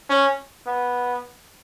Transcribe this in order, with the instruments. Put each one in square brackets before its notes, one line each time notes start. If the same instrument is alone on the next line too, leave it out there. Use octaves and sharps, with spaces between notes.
[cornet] C#4
B3